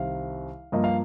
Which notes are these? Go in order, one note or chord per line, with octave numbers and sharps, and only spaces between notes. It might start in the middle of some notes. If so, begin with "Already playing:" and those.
Already playing: C2 C3 D#3 F5
G2 F3 A#3 D#5
F5